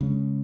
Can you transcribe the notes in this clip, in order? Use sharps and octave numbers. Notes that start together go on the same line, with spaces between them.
C#3 G#3 C#4